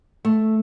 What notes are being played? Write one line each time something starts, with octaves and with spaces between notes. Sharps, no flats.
A3